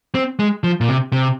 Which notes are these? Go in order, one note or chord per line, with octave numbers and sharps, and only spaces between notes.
C4
G#3
F3
A#2
C3
C3